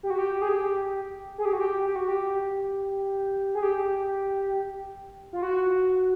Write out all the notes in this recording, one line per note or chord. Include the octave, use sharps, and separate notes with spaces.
G4
F#4
G4
G#4
G4
G#4
G4
F#4
G4
G4
F#4
G4
G#4
G4
F4
F#4